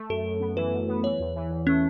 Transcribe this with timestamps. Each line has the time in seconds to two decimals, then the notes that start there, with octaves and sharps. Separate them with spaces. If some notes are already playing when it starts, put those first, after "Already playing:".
Already playing: A3
0.10 F#2 A4
0.25 F#2
0.40 B3
0.56 E3 B4
0.72 F#2
0.88 B3
1.04 E3 C#5
1.20 E2
1.36 E3
1.51 E2
1.67 A3 C#4